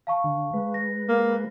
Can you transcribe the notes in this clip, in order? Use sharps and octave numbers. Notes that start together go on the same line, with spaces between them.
F5 A5 C#6
D3
G#3 B4
A#6
A#3